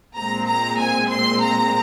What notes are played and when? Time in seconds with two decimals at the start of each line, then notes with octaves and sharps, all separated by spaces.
0.17 A#2 G#3 C4 A#5
0.49 A#5
0.80 G#5
1.11 C6
1.42 A#5